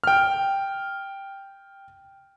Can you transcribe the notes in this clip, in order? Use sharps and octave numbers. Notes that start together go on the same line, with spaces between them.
G5 F6